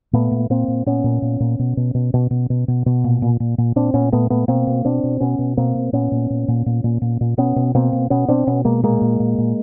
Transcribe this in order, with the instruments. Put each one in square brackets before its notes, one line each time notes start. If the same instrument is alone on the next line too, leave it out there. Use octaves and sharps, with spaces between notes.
[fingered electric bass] A#2 A3 B3
A#2
A#2 A#3 C4
A#2
A#2 B3 C#4
A#2
A#2
A#2
B2
B2
B2
B2
B2
B2
B2
B2
A#2
A#2
A#2
A#2
A#2 C4 D4
A#2 B3 C#4
A#2 A3 B3
A#2 A3 B3
B2 A#3 C4
B2
B2 C4 D4
B2
B2 B3 C#4
B2
B2 A#3 C4
B2
A#2 B3 C#4
A#2
A#2
A#2
A#2
A#2
A#2
A#2
B2 B3 C#4
B2
B2 A#3 C4
B2
B2 B3 C#4
B2 C4 D4
B2 B3 C#4
B2 G#3 A#3
A#2 G#3 A#3
A#2
A#2
A#2